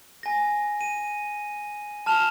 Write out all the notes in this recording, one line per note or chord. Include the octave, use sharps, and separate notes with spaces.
G#5 A#6
D#7
A5 F6 E7 F7